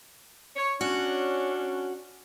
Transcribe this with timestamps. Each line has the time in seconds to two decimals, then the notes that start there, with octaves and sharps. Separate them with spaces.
0.57 C#5
0.81 C#4 D4 F#4